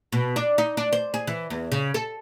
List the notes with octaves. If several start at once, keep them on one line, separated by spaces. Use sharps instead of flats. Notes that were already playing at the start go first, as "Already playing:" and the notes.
B2
D4
D#4
D4
C5
G#4
E3
E2
C#3
A4